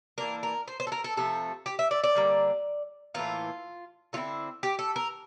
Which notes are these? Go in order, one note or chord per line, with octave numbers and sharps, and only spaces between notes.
E3 A#3 D4 A#4
A#4
C5
C5
A4
A#4
A4
C3 F3 A3 A4
G4
E5
D5
D5
D3 G3 A#3
A2 E3 A#3 F4
D3 A3 C4 E4 F4
G4
A4
A#4